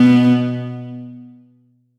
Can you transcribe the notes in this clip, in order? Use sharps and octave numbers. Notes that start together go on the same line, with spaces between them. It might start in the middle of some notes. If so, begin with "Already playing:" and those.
Already playing: B2 B3